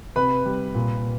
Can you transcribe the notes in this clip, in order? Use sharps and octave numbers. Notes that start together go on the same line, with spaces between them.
C3 B4 B5
G3
A#2